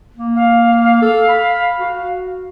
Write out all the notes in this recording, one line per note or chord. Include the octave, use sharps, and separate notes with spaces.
A#3
F5
A4
B5
F#4